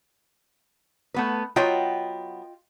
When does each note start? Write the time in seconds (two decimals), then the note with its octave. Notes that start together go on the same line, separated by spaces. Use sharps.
1.14 A3 B3 B4
1.56 F#3 B3 F4 D#5 G5